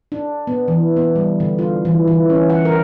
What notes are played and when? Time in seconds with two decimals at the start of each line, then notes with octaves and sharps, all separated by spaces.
0.12 D4
0.47 B3
0.68 E3
0.97 B3
1.16 G3
1.40 D3
1.59 F4
1.85 E3
2.08 E3
2.30 C#4
2.50 F#5
2.65 A#4